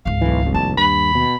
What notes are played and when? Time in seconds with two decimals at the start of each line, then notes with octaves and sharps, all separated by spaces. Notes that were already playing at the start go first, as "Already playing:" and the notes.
0.06 G#1 C#2 F5
0.21 B1 E3
0.42 F1 C2
0.54 D#2 A5
0.77 G2 B5
1.15 B2